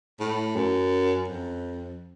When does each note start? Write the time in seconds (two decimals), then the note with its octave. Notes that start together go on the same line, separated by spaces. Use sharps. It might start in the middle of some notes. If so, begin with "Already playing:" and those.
0.20 A2
0.56 F#2
1.28 F2